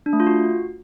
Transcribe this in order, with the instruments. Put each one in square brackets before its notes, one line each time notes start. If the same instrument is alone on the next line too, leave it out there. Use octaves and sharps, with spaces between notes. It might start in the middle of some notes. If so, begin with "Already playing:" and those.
[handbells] D4
A3
F4
F#4